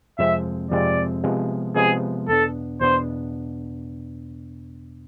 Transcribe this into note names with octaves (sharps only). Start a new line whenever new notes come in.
F2 C3 F3 G#3 C4 E5
F2 C3 F3 G#3 C4 D5
C3 F3 G#3 B3
C3 F3 G#3 B3 G#4
E2 B2 B3 D4 A4
E2 B2 B3 D4 C5